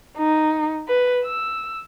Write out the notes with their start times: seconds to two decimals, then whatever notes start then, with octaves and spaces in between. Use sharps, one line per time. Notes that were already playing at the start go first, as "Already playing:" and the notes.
0.17 D#4
0.88 B4
1.25 E6